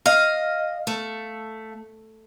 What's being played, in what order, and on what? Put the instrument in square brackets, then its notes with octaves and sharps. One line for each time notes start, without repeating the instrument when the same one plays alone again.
[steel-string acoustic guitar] D#5 [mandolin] F5
[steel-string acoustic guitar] A3